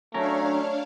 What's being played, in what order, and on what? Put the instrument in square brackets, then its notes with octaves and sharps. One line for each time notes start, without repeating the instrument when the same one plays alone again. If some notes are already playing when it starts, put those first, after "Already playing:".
[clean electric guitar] F#3 C#4 A#4 [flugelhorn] A3 [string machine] D4 C#5 F5